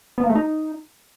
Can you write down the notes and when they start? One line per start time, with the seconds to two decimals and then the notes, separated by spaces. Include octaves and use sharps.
0.18 B3
0.24 A#3
0.30 A3
0.35 D#4